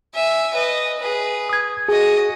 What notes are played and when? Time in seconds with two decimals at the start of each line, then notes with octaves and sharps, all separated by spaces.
0.15 E5 G#5
0.54 B4 D#5
0.99 G#4 B4
1.49 D#6 G#6
1.89 F#4 G#4 D#5 G#5